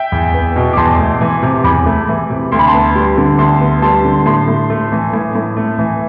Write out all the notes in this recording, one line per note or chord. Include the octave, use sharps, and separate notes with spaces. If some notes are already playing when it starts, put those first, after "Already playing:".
Already playing: E5 G5
E2
B3
B2
D6
E2 A5 C6
A3
E3
C3
E2 B5 D6
A3
E3
C3
D2 C6
B5
A5 C6
B3
G3
D3
D2 A5 C6
B3
G3 A5 C6
D3
A2 A5 C6
A2
A3
E3
A2
A2
A3
E3